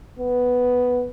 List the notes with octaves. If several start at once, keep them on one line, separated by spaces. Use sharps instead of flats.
B3